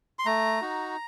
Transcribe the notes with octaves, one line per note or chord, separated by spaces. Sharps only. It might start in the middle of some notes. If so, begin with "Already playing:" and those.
C6
A3 A#5
D#4 F#4